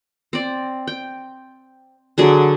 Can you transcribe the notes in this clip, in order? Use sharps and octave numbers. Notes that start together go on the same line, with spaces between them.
C4 D5
G5
D3 F#3 G#4